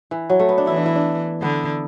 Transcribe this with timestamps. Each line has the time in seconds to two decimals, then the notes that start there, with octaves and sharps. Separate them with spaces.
0.11 E3
0.30 F#3
0.39 A3
0.49 B3
0.58 D4
0.67 E3 E4
0.76 D4
0.86 E4
0.95 D4
1.42 D3 B3